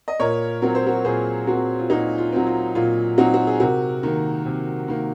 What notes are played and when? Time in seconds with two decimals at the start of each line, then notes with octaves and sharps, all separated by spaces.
0.08 D#5
0.20 A#2 A#4 C#5
0.62 F#3 C4 A#4
0.75 C5
0.86 F#4 A#4
1.05 A#2 G#4 C5
1.47 F#3 C4 F#4 A#4
1.79 F4
1.90 A#2 D#4 F#4
2.18 F4
2.32 F#3 C4
2.47 F4
2.75 A#2 F4
3.18 F#3 C4 D#4 F#4
3.34 F#4
3.47 G#4
3.60 C3 F#4 A#4
4.03 D#3 A#3
4.46 C3
4.88 D#3 A#3